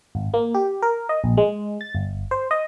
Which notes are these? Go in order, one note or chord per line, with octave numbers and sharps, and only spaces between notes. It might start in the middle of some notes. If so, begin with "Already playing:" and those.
G#1
A#3
G4
A#4
D#5
A#1
G#3
A6
G1
C5
D#5